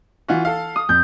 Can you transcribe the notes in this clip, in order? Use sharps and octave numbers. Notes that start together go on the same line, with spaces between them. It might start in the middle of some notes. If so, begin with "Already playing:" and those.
E3 F4 F#4
A4 F5
D#6
F2 G6